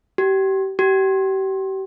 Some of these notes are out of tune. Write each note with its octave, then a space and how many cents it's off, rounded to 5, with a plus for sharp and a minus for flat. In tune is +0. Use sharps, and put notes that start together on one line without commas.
G4 -30
G4 -35